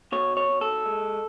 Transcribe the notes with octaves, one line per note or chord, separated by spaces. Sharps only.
B2 C#5
C#5
B2
A4
G#3